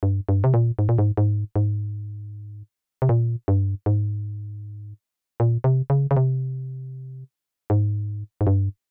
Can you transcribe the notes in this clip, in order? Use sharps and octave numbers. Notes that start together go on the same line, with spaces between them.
G2
G2
C3
A#2
G#2
A#2
G#2
G#2
G#2
C3
A#2
G2
G#2
A#2
C3
C#3
C#3
C3
G#2
G#2
G2